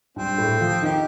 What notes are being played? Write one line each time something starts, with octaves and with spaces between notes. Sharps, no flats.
G2 G3 C4
A2 A3
F3 F4
D#3 D#4 G4